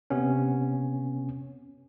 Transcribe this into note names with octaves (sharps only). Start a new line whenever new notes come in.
C3 B3 C#4